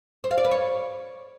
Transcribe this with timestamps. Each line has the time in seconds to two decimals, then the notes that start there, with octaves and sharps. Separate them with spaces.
0.24 C5
0.31 F5
0.38 D5
0.44 B4
0.51 C#5